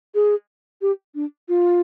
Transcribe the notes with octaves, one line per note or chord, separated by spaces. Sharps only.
G#4
G4
D4
F4